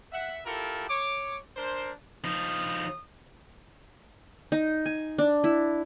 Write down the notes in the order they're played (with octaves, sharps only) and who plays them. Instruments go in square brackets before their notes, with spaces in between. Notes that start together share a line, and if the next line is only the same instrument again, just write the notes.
[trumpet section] E5 F#5
E4 F4 G4 A4 A#4
C#5 D6
D4 A#4 C5
[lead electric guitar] F3 D#4 [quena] D#6
[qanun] D#4
G#5
D4
E4